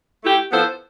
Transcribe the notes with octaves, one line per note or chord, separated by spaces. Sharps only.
A3 E4 G4
F3 B3 E4 A4 C5